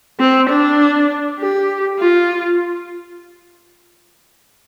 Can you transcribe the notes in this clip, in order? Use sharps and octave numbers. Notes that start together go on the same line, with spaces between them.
C4
D4
G4
F4